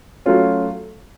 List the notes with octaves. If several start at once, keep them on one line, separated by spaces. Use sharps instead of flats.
F#3 A3 C#4 F4